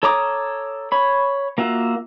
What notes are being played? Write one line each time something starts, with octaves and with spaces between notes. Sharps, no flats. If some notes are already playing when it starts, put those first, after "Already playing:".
A4 C#5 A#5 D6 D#6
C#5 B5
A#3 F4 F#4 E5